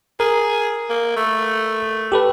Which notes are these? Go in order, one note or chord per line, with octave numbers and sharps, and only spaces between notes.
G#4 A#4
A#3
A3
G4 A4 B4